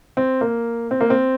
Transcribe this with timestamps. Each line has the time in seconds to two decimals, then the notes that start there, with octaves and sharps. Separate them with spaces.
0.17 C4
0.41 A#3
0.91 C4
1.01 A#3
1.10 C4